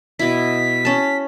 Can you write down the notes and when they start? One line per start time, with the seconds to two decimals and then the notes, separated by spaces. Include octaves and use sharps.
0.19 B2 E4 B6
0.85 C#4 A5